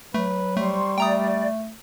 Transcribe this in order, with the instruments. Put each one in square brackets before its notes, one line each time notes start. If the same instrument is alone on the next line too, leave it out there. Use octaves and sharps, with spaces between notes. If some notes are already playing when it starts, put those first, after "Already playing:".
[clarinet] F#3 [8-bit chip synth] A3 [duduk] B4
[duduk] G3 [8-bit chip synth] A3 [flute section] C5 C6 C#6
[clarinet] A3 [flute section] D5 [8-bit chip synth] G5 A#5 D#6